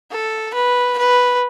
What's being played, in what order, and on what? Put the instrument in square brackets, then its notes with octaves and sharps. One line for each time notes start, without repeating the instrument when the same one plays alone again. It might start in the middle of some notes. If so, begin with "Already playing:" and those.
[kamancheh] A4
B4
B4